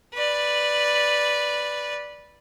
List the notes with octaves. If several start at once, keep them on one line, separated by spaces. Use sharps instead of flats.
B4 D5